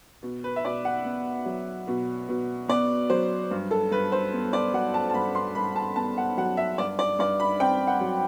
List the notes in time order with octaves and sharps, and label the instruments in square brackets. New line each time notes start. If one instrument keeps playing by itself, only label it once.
[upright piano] B2
B4
E5
B2 D5
F#5
B3
F#3
B2
B2
B3 D5
F#3 C5
G2
A4
G2 B4
C5
B3
D5
F#3 F#5
A5
A5
G2 B5
C6
G2 B5
A5
B3 A5
F#5
F#3 F#5
E5
G2 D5
D5
G2 D5
B5
C4 G5
F#5
F#3